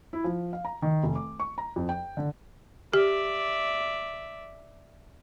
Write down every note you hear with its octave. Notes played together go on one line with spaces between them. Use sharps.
E4
F3
F5
A#5
D#3
F1
D6
C#6
A#5
F2
G5
D3
G4 D5 E5